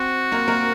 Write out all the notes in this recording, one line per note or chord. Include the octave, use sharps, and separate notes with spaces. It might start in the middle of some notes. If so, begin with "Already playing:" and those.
Already playing: C4 F#4 C5
A#3 A#4
A#3 A#4